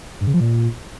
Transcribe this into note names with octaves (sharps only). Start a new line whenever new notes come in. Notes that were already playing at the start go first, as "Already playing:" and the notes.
G2
C#3
F3
A#2